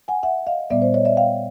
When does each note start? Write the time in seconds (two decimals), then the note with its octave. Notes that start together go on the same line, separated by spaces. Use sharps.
0.08 F#5 G#5
0.23 E5 F#5
0.47 D#5 F5
0.70 A#2 G3 B3 D5 E5
0.82 C5 D5
0.94 C#5 D#5
1.05 D5 E5
1.17 F5 G5